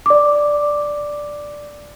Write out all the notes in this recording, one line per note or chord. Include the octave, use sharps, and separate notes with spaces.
D5 D6